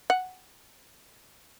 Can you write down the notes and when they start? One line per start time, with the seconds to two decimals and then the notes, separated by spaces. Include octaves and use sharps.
0.10 F#5